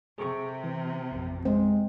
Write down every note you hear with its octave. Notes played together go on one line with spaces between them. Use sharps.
C3 G#4 A4 C#6
E3
A1 F2
G#3 C4